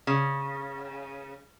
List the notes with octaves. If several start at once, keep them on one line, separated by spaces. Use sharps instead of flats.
C#3